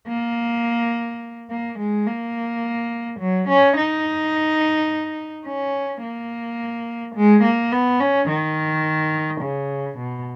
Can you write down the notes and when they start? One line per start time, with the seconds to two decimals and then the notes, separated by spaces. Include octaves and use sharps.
0.08 A#3
1.50 A#3
1.79 G#3
2.07 A#3
3.19 F#3
3.48 C#4
3.76 D#4
5.46 C#4
6.02 A#3
7.15 G#3
7.43 A#3
7.72 B3
8.00 C#4
8.28 D#3
9.41 C#3
9.98 B2